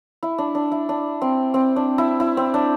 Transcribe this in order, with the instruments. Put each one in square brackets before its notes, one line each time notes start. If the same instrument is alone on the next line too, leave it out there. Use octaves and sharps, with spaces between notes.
[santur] E4
D4
D4
E4
D4
C4
C4
D4
E4
E4
C4
D4